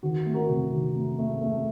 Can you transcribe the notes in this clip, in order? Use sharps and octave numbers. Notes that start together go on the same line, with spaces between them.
D#3 F#4
A3
F#4 A#4
C3
D#3
A3
A3
A3